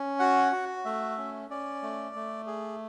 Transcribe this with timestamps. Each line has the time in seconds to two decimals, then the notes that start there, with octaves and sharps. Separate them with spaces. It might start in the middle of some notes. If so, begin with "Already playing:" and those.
Already playing: C#4
0.19 F#4 F#5
0.52 F#4
0.85 A3 E5
1.18 C#4
1.50 C#4 D5
1.82 A3
2.15 A3
2.47 G#4